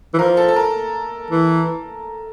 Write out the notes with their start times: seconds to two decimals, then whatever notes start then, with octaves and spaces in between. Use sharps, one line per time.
0.14 E3
0.18 F3 A#4
0.37 A4
0.48 A4
0.56 A#4
1.31 E3